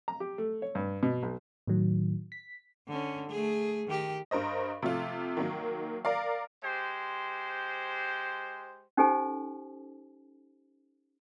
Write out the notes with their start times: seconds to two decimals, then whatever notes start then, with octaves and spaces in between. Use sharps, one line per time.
0.08 A#5
0.20 G4
0.38 A3
0.62 C#5
0.75 G2
1.03 B2
1.23 B1
1.67 A2 D#3 F#3
2.32 B6
2.88 D3 C#4
3.30 A3 G#4
3.87 D#3 G4
4.31 G2 A#4 C5 D#5
4.83 C3 F3 A3 F4
5.37 D#3 F#3 A#3
6.05 A#4 D5 F5
6.64 G#3 G4 C5
8.97 C#4 D#4 G4 A4 C5 G#5